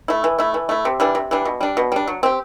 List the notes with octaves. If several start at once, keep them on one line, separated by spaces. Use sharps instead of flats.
A3 E4
E3
A3 E4
E3
A3 E4
C3
E3 G3 D4
C3
E3 G3 D4
B2
G3 D4
B2
G3 D4
F#3
C4 G4